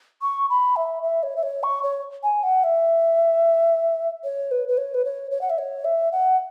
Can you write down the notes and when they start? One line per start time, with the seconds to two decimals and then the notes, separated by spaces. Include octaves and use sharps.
0.22 C#6
0.50 B5
0.76 E5
1.03 E5
1.23 C#5
1.36 E5
1.43 C#5
1.63 C#6
1.83 C#5
2.23 G#5
2.43 F#5
2.64 E5
4.24 C#5
4.51 B4
4.68 B4
4.77 C#5
4.94 B4
5.05 C#5
5.31 C#5
5.41 F#5
5.50 E5
5.58 C#5
5.85 E5
6.12 F#5